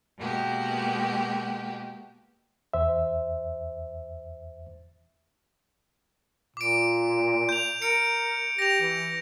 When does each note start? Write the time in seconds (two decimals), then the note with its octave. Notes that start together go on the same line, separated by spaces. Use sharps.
0.17 B2 G#3 A#3 F#4 G4
2.74 E2 C5 E5
6.57 A#2 D6 D7
7.49 G6 F7
7.82 A#4 C#7 D7
8.59 G4 A#6 F7
8.81 E3